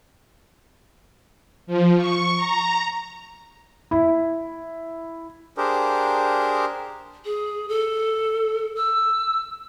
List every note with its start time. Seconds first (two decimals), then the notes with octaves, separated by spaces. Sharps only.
1.67 F3
1.97 C#6
2.36 A#5
3.91 E4
5.57 D4 G4 G#4 A#4 C5
7.25 G#4
7.69 A4
8.77 E6